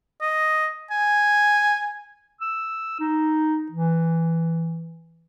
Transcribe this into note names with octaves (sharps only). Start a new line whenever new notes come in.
D#5
G#5
E6
D#4
E3